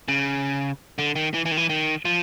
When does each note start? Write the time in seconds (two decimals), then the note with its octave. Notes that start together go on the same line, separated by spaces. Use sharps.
0.08 C#3
0.98 D3
1.16 D#3
1.34 E3
1.45 E3
1.51 D#3
1.57 E3
1.69 D#3
2.05 F3